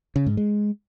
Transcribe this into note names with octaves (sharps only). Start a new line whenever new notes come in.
C#3
G#2
G#3